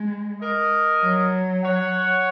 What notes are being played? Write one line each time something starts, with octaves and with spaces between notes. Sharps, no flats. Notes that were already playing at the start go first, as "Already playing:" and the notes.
Already playing: G#3
A#4 D#5
F#3
C#5 F#5